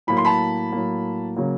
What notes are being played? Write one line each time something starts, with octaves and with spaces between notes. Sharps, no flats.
A2 F#3 A#3 B5
C6
A5 B5
A2 F#3 A#3
C#3 F#3 A#3